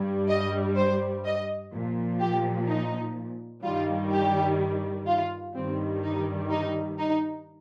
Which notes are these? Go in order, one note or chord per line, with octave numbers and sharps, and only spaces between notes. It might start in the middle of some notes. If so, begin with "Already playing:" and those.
Already playing: G2 G3
D#5
C5
D#5
A#2 F3
G4
D#4
G2 D#3 G3 F4
G4
F4
G2 D#3 G3 C4
D#4
D#4
D#4